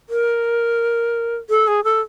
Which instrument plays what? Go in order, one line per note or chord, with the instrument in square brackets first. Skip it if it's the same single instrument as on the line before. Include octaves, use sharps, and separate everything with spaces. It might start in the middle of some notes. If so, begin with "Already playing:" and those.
[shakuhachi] A#4
A4
G#4
A4